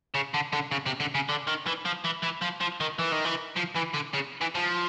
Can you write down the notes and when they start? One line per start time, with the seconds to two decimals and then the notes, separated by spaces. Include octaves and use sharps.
0.15 C#3
0.34 D3
0.53 D3
0.71 C#3
0.86 C3
1.00 D3
1.15 C#3
1.29 D3
1.47 D#3
1.66 E3
1.85 F3
2.04 E3
2.23 E3
2.41 F3
2.60 F3
2.80 D#3
2.99 E3
3.12 D#3
3.25 E3
3.56 F3
3.75 E3
3.94 D3
4.13 C#3
4.41 E3
4.55 F3